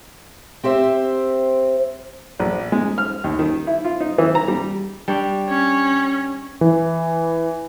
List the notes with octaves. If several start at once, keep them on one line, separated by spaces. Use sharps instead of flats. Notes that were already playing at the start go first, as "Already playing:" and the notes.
C4 G4 C5 E5
A#1
G#3
F6
D#2
D#3
E4
F4
D#4
E3
A#5
G3
G3 D4 C#5
C#4
E3